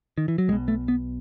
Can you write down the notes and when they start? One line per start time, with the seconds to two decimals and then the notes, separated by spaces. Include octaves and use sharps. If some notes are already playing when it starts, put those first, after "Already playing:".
0.18 D#3
0.28 E3
0.38 F#3
0.48 B1 G#3
0.52 B2
0.68 A3
0.88 B3